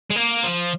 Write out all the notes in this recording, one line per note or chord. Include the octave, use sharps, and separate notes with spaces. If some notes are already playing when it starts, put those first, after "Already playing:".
G#3
A#3
F3